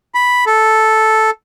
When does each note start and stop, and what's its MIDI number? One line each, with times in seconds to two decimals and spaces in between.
0.15 0.45 83
0.47 1.30 69